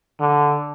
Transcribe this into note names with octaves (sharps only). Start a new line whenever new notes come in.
D3